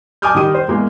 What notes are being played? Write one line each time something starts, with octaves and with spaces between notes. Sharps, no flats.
G#5 A5 D6 D#6 F6 G6
D#3 G3 D#6 D#7
C5
E2 G#3 A#3